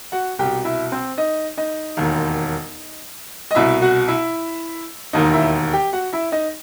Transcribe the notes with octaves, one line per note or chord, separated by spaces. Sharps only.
F#4 F#5
C2 B2 G4 G5
E4 E5
C4 C5
D#4 D#5
D#4 D#5
E1 D#2 D#3
D#5
C2 B2 E4 E5
F#4 F#5
E4 E5
E1 D#2 D#3 D#4 D#5
E4 E5
G4 G5
F#4 F#5
E4 E5
D#4 D#5